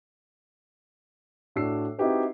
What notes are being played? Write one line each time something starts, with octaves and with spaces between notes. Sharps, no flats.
A2 D4 F#4 E6 C7
C4 D#4 E4 F#4 G4 B4